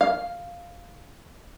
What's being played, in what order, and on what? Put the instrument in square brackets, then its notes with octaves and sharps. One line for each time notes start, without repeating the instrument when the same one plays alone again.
[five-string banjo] F5